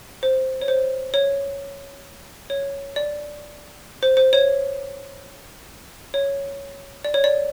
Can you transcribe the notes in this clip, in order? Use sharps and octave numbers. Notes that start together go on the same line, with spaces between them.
C5
C#5
C5
C#5
C#5
D5
C5
C5
C#5
C#5
D5
C#5
D5